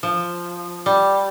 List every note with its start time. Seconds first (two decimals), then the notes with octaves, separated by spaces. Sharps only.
0.03 F3
0.86 G3